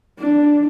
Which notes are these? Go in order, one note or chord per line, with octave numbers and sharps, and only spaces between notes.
D4